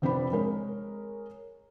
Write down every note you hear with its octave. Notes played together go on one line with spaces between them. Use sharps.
F1 C4 D4 B5
G#3 A#4 C#5